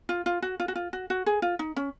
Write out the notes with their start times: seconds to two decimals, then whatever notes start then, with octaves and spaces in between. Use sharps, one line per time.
0.09 F4
0.26 F4
0.42 F#4
0.60 F4
0.68 F#4
0.76 F4
0.93 F#4
1.10 F#4
1.26 G#4
1.42 F4
1.59 D#4
1.76 C#4